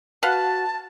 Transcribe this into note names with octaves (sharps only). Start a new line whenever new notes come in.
F#4 B4 F5 F#5 A5